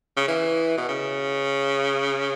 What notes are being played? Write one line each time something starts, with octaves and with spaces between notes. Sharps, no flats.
C#3
E3
B2
C#3